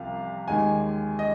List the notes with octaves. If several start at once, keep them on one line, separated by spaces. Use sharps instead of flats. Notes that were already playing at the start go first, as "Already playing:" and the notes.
Already playing: C2 C3 F3 F5
D#2 D#3 G#3 G#5
D#5